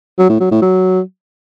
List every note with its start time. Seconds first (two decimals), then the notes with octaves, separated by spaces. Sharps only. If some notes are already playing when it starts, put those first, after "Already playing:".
0.19 F#3
0.30 A2
0.40 F#3
0.51 A2
0.62 F#3